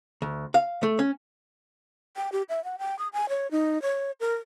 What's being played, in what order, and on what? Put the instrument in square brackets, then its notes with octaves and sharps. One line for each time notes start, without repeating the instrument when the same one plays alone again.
[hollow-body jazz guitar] D2
F5
A3
C#4
[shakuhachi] G5
G4
E5
F#5
G5
D#6
G#5
C#5
D#4
C#5
A#4